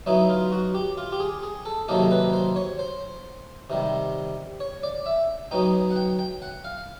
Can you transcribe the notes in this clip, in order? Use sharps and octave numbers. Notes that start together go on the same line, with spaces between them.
F#3 B3 D#4 E4
F4
F#4
G4
F4
G4
G#4
G#4
A4
C3 D#3 F#3 A#3 D#4 A4
B4
C5
C#5
C5
C3 D#3 G3
C#5
D5
E5
F#3 B3 D#4 G5
F#5
G5
G5
F#5
F5